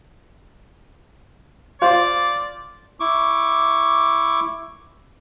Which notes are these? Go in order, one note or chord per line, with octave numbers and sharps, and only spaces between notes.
F4 C5 D5 F5
E4 C#6 D6